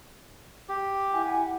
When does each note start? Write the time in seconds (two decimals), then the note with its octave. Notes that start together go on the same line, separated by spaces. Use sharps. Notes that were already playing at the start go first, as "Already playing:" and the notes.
0.69 G4
1.13 E4 F#5 G#5